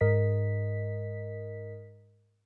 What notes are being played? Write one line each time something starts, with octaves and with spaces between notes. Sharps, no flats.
G#2 A#4 D#5 B6